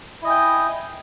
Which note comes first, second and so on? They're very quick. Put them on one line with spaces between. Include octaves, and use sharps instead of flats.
E4 D#5 G#5 G5